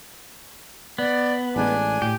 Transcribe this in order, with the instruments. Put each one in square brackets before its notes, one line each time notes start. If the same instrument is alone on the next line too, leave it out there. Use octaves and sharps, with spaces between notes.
[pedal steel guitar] B3 [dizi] D5
[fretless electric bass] A1 G#3 [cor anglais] D4 [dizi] G#5
[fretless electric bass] A2 [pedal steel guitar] G4